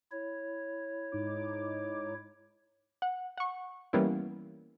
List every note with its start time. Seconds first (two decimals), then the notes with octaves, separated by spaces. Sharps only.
0.11 E4 C#5
1.12 G#2 D#4 D6
3.02 F#5
3.38 F#5 C#6
3.93 E3 G3 A#3 B3 C#4 E4